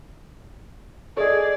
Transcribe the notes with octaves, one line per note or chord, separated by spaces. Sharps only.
G#4 A4 D5 D#5